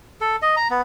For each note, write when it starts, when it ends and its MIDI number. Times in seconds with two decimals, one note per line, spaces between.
0.21 0.36 69
0.42 0.55 75
0.57 0.68 82
0.70 0.81 59